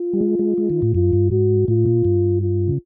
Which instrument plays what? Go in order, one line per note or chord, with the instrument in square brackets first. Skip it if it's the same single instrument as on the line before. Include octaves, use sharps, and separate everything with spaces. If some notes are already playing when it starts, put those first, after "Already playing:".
Already playing: [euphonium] F4
[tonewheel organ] G3
G#3
G#3
G#3
D#3
A2
[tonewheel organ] F#2 [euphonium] F4
[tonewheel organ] G2
[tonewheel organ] G#2 [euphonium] F#4
[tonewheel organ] A2 [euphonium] F4
[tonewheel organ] A#2
G2
[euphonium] F4
[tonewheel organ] C#3